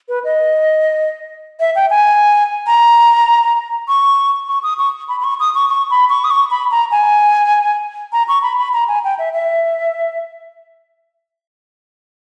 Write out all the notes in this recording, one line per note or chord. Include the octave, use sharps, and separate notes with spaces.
B4
D#5
E5
G5
G#5
A#5
C#6
C#6
D#6
C#6
B5
B5
C#6
D#6
C#6
C#6
B5
C#6
D#6
C#6
B5
A#5
G#5
A#5
C#6
B5
B5
A#5
G#5
G5
E5
E5